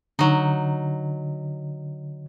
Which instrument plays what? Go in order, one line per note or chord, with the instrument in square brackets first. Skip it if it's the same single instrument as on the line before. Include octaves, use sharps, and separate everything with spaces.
[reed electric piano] D3 [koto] F#3 D#4